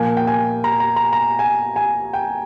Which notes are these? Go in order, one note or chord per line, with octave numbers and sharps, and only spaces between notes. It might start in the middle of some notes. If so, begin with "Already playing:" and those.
Already playing: A#2 F3 A#3 G#5
G5
G#5
A#5
A#5
A#5
A#5
G#5
G#5
G5